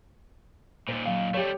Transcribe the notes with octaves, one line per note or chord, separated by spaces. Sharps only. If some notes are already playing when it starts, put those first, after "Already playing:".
D#2 A#2 C5
F#3 F5
G3 A3 G4 C#5